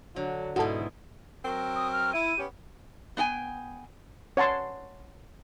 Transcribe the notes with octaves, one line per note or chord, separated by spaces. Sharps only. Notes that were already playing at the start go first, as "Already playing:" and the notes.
D3 F#3
G#2 B2 E4 F#4 A4
F#3 C4 A#4
D#6
F6
E4 D#7
B3 C#4 G4
B3 D4 G5 G#5
C#5 F#5 A5 C6